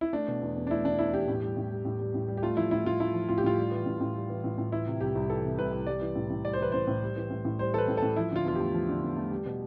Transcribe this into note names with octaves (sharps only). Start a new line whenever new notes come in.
E4
A3 D4
B2
E2
E2
D4
A3 E4
B2 D4
E2 E4
E2 G4
A2
G3
A2
G3
A2
G3
A2
G3
G4
A3 F4
F3 E4
A2 E4
A2 F4
A3 E4
F3
A2 F4
G4
A2 F4
G3
E3
A2
A2
G3
E3
A2
A2
E3 E4
C3
C2 G4
C2
E3 A4
C3
C2 B4
C2
G3 D5
E3
A2
A2
G3 D5
C5
E3 B4
A2 C5
A2
G3
E3
A2
A2
G3 C5
E3 A4 B4
A2
A4
A2
F3 E4
D3 F4
E2 F4
A3 G4
F3
D3
E2
A3
G3
B2